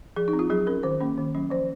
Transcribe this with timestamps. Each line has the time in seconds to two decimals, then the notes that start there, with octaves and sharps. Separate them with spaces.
0.16 F3 G#4
0.28 D#4
0.33 C4
0.39 F4
0.50 F#3 G#4
0.67 C#4 A#4
0.83 D#3 C5
1.01 A#3 C#4
1.18 D#3
1.35 F#3 C#4
1.50 F3 C5